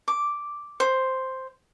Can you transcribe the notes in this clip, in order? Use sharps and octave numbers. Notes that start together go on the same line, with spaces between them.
D6
C5